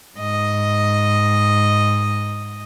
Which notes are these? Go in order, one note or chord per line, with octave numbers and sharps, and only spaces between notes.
G#2 D#5